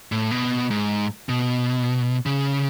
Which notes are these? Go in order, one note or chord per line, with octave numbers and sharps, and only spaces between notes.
A2
B2
G#2
B2
C#3